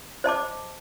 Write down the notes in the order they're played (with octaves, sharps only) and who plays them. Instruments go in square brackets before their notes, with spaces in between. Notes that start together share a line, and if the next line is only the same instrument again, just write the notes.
[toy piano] C5 D#5 A5 D6